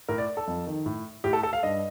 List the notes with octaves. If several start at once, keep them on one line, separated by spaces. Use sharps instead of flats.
A2 A#4
D5
A4
F2
D#3
A2
A2 G4
A4
A4
F5
G2 D#5